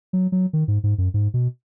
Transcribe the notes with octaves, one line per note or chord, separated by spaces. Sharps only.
F#3
F#3
D#3
G#2
G#2
F#2
G#2
B2